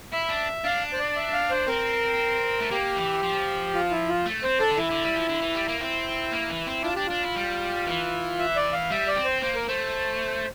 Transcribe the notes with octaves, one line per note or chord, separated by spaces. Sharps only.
E4 E5
D4
D4 F5
C5
D5
E5
F5
C5
C4 A#4
A3
A#3 G4
E3
F3
F4
E4
F4
A3
C4 C5
D4 A4
D3
E3 E4
D3
G3
F3
D3
E3
G3
A#3
C4 E4
A#3
E3
C4
D4 F4
D4 G4
D4 F4
E4
G3
E3
E5
D5
F5
G3 E5
D5
C4
C5
A#3 C5
A#4
A3 C5